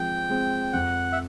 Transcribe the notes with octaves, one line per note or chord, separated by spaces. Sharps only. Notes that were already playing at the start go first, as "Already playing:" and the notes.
Already playing: F3 G#3 C4 G5
G#3 C4
F2 F#5
E5